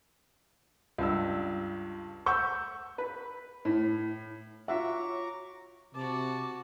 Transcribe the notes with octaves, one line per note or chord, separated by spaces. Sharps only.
C#2 G2 E6
F#5 C#6 E6 G6
B4
A2
F4 F#4 C#5 E5 F#5 A#5 C#6 D6
C3 F#4 A5 D6